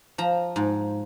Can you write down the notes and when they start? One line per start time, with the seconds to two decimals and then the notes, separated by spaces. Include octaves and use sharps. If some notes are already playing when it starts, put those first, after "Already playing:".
0.18 F3 A#5
0.56 G#2